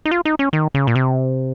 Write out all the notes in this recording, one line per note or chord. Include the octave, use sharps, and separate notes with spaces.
D#4
F4
D#4
C#4
D#3
C#3
A#2
C3